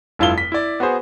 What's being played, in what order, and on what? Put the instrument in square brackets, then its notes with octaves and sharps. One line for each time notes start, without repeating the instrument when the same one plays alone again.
[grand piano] F1 G2 E4 F4 F5 G7
B6
E4 D5
B3 F#4 G#4 C5